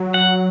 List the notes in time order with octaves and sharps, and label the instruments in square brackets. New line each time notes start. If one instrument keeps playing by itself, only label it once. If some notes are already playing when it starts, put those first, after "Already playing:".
Already playing: [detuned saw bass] F#3
[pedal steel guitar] F#5